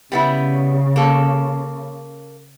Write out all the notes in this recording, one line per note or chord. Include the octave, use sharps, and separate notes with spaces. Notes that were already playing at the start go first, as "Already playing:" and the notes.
C#3 G3 B3 E4
A#3 A4